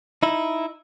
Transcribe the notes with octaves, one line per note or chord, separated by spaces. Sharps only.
D#4 E4